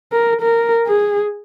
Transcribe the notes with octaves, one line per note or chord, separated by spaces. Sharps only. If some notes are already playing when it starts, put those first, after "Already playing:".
A#4
A#4
G#4